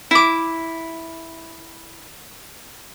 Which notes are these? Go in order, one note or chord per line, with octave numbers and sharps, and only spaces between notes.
E4 D6